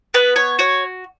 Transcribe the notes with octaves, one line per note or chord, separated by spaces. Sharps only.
B3 B4
C#5
F#4 C#5